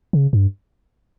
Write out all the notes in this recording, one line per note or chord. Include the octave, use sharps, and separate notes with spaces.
C#3
G2